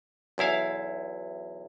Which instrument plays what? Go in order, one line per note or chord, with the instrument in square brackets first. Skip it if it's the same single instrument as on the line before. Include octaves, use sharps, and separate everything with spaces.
[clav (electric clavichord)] B1 E2 E4 F5